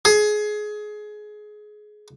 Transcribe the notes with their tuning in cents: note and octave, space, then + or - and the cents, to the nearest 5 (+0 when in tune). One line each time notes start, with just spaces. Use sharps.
G#4 +20